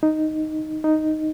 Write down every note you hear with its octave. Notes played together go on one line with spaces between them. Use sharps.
D#4
D#4